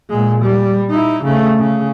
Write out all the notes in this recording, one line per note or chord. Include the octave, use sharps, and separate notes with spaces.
A#2 G#3
G3
D#4 E4
C#3 A3
C#3